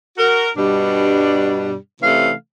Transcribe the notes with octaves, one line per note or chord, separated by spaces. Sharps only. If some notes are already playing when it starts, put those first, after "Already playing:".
F#4 A#4
G2 B2 G3 D4
C3 E3 A3 C#4 F5